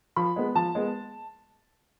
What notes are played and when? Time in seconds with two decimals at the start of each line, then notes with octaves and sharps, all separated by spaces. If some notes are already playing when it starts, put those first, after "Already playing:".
0.16 F3 B5
0.36 G#3 B3
0.55 F3 A5
0.75 G#3 B3